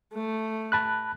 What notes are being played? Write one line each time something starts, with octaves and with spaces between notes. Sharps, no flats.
A3
A5 B5 F#6